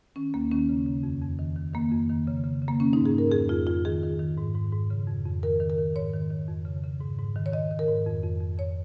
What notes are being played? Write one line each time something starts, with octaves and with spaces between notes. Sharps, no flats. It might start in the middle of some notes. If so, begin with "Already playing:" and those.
D#3 C#4
D#2 A#3
D#3 C#4
C#3
C#3
F2
F2
D#3
D#3
D#3 A#3
F2
D#3
C#3
C#3
C#3
A#3
D#3 C#4
G#2 D#4
G#4
G#2 A#4
F2 G#4
F2 F4
F2 F4
D#3 G#4
D#3
D#3
G#2
G#2
G#2
C#3
F2
F2
D#3 A#4
D#3
A#4
D#3
G#2 C#5
D#3
D#3
F2
C#3
C#3
G#2
G#2
D#3
C#5
D#3 D#5
D#3
A#4
G#2
F2
F2
F2
F2 C#5